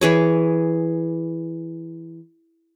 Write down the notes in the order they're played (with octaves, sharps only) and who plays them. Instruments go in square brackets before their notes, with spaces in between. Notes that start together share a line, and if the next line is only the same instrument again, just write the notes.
[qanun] E3 G#4 C#5